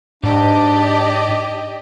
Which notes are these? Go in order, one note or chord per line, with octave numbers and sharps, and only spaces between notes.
G#2 D4 G4 D5 D#5